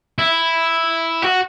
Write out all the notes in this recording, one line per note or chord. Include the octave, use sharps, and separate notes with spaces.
E4
F#4